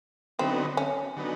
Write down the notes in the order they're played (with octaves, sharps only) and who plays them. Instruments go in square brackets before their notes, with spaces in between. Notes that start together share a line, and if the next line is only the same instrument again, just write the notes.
[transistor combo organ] D3 F#3 B3 D#4 [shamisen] C4
[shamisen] C#4
[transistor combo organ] D3 F#3 B3 D#4